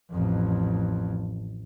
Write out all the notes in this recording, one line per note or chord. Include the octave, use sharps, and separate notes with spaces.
A1 F2